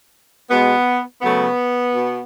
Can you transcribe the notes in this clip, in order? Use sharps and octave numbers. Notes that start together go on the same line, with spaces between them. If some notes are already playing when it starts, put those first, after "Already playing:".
B2 G#3 B3
C#3 F#3 A3 B3
B2